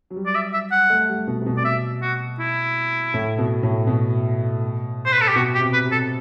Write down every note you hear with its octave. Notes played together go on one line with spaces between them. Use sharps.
F#3
G3
D5
E5
E5
F#5
A3
G3
B2
C3
B2
D5
E5
F#4
E4
A2
B2
A2
B2
C5
B4
A4
G4
B2 F#4
G4
C3
B4
C3
A4